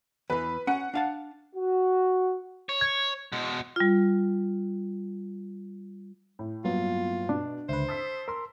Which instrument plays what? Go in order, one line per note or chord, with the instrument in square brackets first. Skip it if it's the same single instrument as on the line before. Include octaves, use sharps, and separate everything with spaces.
[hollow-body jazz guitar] E2 E3 [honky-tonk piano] B4
[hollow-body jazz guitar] C#4 [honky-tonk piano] F#5
[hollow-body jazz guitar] D4 F5 A5
[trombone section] F#4
[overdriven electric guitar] C#5
[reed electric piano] G#6
[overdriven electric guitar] B2 G#3
[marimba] G3 F4
[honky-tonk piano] A2
[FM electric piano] G2 B3 [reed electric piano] F#3 A#3 [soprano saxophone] F4
[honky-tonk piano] B2 [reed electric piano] D4
[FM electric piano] C#2 D3 B4 [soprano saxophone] C5 [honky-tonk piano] E5
[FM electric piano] A5 [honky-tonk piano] D#6 E6 B6
[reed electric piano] A#4 C6 [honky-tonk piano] E6